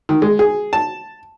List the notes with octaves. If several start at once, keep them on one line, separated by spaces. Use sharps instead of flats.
D#3
G#3
G#4
A5